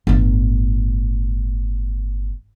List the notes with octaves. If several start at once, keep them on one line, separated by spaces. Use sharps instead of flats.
G1 A2